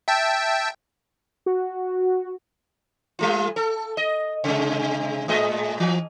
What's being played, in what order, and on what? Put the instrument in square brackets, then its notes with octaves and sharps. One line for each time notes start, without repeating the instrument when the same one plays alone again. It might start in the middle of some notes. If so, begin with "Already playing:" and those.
[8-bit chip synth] E5 G5 A5
[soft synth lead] F#4
[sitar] G3 A3 F4
A4
D#5
C3 G#3
A2 G#3 D#5
E3